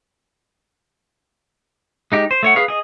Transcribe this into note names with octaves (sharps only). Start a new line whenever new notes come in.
G#3 D#4 G4
C5
A3 C#5 F#5
G#4 B4 F5
G#4 D#5